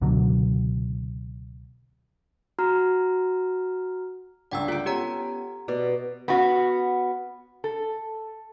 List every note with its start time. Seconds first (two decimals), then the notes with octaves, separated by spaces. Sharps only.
0.02 C#2 B2 D3 F#3
2.59 F#4 A#5 F6
4.51 G1 C#2 D4 F#5 G5 E6
4.68 F4 A4 G5
4.86 B3 C#4 G4 F#5 A#5
5.68 B2 D5
6.28 B3 C#4 F#4
7.64 A4